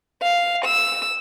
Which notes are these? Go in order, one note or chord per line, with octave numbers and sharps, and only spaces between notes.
F5
E6